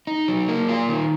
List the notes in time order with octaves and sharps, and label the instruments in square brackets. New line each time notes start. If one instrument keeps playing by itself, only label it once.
[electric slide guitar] D#4
F#3
A#3
F4
D#3